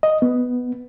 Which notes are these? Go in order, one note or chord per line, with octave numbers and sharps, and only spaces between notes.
D#5
B3